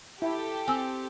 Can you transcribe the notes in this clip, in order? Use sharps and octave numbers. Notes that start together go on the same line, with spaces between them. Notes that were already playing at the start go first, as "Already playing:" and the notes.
E4 G4 A4
C4 G#5 E6